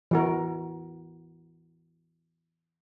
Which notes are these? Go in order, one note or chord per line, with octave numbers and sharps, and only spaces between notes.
E3 F#4 A#4